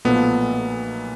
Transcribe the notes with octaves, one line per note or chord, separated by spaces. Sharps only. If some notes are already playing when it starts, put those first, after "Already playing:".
B1 A#2 F3 A3 B3